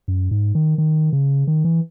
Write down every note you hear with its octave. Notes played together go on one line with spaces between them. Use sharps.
F#2
G#2
D#3
D#3
C#3
D#3
E3